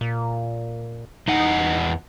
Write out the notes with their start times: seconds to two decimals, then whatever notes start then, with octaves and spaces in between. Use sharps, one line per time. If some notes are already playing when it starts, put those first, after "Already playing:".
0.01 A#2
1.28 E2 D#4 D#5 F#5